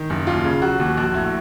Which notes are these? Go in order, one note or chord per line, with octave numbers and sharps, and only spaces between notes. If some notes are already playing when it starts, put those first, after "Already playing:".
Already playing: D#3
F#1
D#2 F4
C#3
F#3 F#4
D#2
A#1 F#4
A2